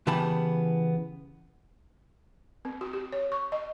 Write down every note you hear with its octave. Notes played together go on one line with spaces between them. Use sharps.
C#3 E3 B3 G4 A5 B5
C4
F#4
G4
C#5
C#6
D#5